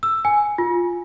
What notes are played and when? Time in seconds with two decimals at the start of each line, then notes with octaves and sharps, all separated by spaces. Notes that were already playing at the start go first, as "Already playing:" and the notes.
0.03 E6
0.25 G#5
0.58 F4